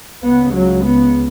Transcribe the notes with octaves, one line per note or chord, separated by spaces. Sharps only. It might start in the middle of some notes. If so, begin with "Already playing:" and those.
C#2 C#3 B3
F#3
B3